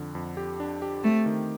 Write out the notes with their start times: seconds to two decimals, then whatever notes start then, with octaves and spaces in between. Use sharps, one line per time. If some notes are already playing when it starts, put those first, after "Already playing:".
Already playing: F2 D3
0.15 F2
0.37 G4
0.60 D4
0.82 G4
1.03 A3 C4
1.26 D#3